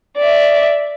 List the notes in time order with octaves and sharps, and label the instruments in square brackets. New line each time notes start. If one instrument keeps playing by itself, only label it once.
[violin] D5 E5